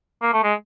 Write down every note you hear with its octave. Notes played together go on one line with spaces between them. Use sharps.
A#3
A3
G#3